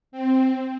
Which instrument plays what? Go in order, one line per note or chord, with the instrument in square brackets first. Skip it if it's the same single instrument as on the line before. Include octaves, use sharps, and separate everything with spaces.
[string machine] C4